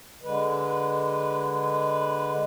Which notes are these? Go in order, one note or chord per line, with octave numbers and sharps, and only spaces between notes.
D3 G#3 B4